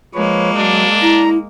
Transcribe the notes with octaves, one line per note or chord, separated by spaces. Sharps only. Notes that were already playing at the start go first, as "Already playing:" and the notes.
F3 G#3 A#3 B4 C#5
F#3 D4
E4 A#5